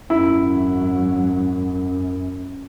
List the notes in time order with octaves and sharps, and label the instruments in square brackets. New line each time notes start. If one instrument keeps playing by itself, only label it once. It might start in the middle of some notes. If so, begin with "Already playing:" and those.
[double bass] G#1 F#3 [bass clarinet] F#2 [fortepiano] E4